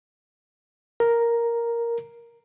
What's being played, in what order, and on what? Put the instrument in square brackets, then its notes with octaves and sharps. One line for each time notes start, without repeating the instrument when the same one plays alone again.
[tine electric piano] A#4